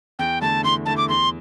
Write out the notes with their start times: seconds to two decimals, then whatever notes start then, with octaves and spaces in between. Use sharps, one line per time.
0.19 E2 G5
0.41 D3 A3 E4 A5
0.64 E2 C6
0.86 D3 A3 E4 A5
0.97 D6
1.09 E2 C6